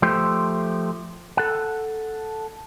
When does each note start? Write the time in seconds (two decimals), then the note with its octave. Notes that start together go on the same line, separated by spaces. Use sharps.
0.02 F3 A3 G4 C5
1.37 A4 F#5